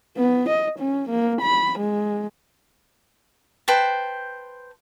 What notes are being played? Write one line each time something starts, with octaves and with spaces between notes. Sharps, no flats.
B3
D#5
C#4
A#3
B5
G#3
B4 C5 G5 A5